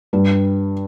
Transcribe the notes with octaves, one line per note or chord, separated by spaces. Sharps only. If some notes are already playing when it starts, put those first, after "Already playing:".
G2 G3